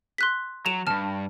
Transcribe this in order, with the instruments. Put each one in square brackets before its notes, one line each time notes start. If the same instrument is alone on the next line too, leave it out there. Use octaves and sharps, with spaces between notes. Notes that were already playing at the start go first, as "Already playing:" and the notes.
[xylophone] C6 F#6 B6
[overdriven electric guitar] F#3 [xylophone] E7 F7
[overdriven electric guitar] D2 G2 [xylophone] A5 F6